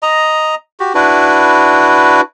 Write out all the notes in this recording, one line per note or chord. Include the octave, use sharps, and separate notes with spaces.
D#5 A#5
F#4 G4
D4 E4 F#4 B4